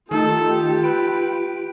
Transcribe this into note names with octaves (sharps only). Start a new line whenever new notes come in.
D#3 A3 D#4 F4 G4 A4
B4 D7